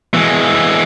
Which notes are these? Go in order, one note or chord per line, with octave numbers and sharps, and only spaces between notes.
E3 G#3